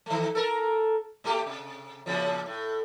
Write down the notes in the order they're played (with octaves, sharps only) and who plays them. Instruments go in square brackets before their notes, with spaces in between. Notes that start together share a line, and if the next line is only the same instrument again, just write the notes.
[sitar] D#3 A3
A4 A#4
A#2 A3 G4
C3
A#2 C#3 F3
A2